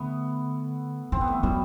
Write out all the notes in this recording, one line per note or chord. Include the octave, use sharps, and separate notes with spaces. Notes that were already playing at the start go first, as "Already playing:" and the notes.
Already playing: D3 A3 B3
E3 C4
B3
A3
F#3 G3